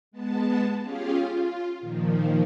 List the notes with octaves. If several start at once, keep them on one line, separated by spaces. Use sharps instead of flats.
G#3 B3 A5
C#4 F4 G4 G#4 F5
F4
A#2 D#3 F3